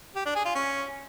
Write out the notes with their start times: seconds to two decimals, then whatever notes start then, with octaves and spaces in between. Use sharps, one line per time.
0.15 G4
0.25 D4
0.35 G#4
0.45 F4
0.55 C#4